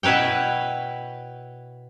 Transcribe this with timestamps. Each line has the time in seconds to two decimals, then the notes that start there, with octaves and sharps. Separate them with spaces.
0.03 B2 E4 B4 C#5 G5